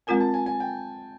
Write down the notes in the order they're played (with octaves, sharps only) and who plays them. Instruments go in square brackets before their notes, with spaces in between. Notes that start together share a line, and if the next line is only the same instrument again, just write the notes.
[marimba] G#3 C4 F4 A#4 [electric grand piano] G#5
[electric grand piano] A5
G#5
G#5
G5